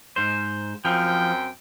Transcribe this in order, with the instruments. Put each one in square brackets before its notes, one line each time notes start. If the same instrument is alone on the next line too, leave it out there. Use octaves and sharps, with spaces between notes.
[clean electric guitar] G#2 C5
[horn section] F#2 C4 G5 [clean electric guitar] F3